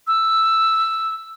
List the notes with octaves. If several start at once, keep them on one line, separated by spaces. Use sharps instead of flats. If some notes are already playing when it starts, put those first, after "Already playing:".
E6